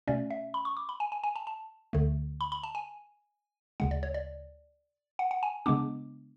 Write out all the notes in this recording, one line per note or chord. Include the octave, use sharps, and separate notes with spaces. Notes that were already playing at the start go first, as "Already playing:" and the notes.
B2 A3 C#4 D5
E5
B5
C#6
D6
B5
G#5
G#5
G#5
A5
A5
D2 D3 A3
B5
B5
A5
G#5
D2 C#3 G#3 F#5
D5
C#5
D5
F#5
F#5
G#5
C#3 G#3 B3 D4 D6